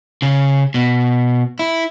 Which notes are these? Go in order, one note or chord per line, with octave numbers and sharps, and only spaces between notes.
C#3
B2
E4